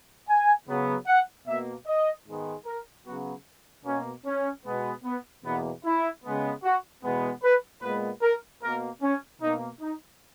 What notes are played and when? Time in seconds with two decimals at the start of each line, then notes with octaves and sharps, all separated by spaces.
0.28 G#5
0.67 C#3 F#3 B3
1.07 F#5
1.47 B2 A#3 E5
1.87 D#5
2.27 G#2 D#3 G#3 B3
2.65 A#4
3.05 C#3 F#3 B3 F#4
3.85 B2 A#3 C#4
4.25 C#4
4.65 B2 G#3 B3
5.04 B3
5.44 E2 B2 A#3 B3
5.84 E4
6.24 C#3 G#3 B3
6.63 F#4
7.03 E2 B2 G#3 B3
7.43 B4
7.82 A#2 G#3 B3 B4
8.22 A#4
8.62 B2 A#3 A#4
9.02 C#4
9.41 B2 A#3 D#4
9.81 D#4